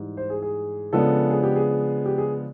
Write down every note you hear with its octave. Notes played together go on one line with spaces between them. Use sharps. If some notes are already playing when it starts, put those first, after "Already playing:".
Already playing: G#2 E3 G3
C5
G#4
G#4
C#3 F3 G#3 B3 D4 A4
G#4
G4
G#4
G4
G#4